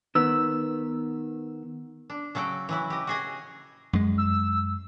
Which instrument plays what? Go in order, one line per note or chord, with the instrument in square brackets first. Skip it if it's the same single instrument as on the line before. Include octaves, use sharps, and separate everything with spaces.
[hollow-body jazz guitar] D#3 B3 [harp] E6
[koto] D4
C#3 F#3 A4 G5
E3 F#3 E4
G4 D#5
F#4 G#4 D#5
[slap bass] F#2 G#3
[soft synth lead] E6